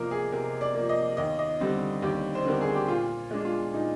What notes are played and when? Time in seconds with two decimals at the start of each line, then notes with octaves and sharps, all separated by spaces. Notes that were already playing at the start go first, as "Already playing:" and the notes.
Already playing: C3 F3 A#3 A#4 D#5 F5
0.11 G#4
0.32 C3 A#4
0.61 D5
0.75 F3 A#3
0.89 D#5
1.17 D#2 D#5
1.39 D#5
1.60 D3 G3 C4
2.02 D#2 G4
2.35 C5
2.45 D3 G3 C4 A#4
2.61 G#4
2.74 G4
2.88 A#2 F4
3.31 G#3 D4
3.45 F4
3.73 A#2 D#4